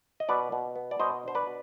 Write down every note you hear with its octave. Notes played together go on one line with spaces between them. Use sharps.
D#5
B2 B4 D5
B2
B3
D5
B2 C5 D#5
D4 C5
B4 D5
B2